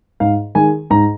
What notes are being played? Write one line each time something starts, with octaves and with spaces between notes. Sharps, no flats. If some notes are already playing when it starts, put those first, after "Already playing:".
G#2 F5
D#3 G#3 G#5
G#2 A#5